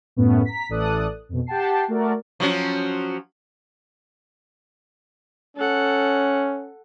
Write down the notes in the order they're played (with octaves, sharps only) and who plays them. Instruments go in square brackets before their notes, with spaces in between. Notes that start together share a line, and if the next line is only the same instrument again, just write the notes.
[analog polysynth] F#2 A2 B3 C#4
A#5 B6
A1 E3 A4 D5 D#6 F#6
F2 B2
G4 F#5 G5 A5 C7
A3 F#4 A#4 D5
[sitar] F3 F#3 C#4
[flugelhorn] C#4 [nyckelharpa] A4 F#5